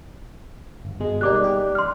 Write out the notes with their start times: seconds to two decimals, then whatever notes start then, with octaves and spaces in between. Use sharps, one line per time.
0.85 G1
1.00 B2 G#3
1.21 G3 A#3 D#4 D5 D6 F#6
1.44 G4
1.75 C6 F6